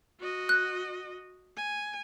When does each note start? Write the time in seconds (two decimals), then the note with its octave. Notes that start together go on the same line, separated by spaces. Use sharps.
0.20 F#4 D#5
0.49 F#6
1.57 G#5